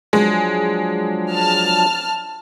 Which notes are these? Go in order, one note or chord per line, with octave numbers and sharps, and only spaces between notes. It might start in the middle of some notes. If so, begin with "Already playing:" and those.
F3 F#3 G#3 D4
A5 F6